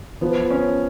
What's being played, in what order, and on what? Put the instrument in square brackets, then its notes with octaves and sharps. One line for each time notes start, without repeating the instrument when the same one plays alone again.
[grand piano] F3 [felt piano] B3
[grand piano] C#4